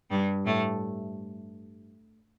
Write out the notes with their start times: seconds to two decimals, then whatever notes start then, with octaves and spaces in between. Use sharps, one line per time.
0.10 G2 G3
0.46 A2 A3